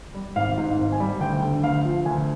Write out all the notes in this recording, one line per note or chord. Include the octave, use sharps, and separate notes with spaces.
G3
G#1 F5
G#2
G#1
G#5
G3
D2 G5
D3
D2 F5
F3
D2 G#5